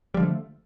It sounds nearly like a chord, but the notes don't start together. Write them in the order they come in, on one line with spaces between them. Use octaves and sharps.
G3 F3 D3 A3